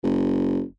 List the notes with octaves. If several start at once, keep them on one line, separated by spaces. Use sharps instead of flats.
F#1